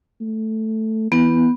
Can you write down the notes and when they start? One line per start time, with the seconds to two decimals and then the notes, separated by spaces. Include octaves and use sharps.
0.21 A3
1.12 E3 B3